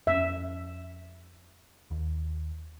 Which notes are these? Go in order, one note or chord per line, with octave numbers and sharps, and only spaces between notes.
F2 B3 C#4 E5
D#2